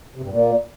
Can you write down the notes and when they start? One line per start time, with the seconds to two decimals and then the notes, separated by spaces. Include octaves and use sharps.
0.16 C3
0.23 G2
0.30 A#2